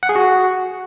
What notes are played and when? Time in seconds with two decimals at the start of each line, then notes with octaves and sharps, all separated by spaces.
0.03 F#5
0.09 G#4
0.15 F#4